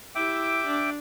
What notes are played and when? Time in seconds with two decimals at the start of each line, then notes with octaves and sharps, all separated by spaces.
0.15 E4 G4 E5 G5 D6
0.66 D4